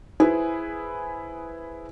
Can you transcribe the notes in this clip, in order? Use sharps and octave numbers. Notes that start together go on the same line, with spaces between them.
E4 G#4 B4 C5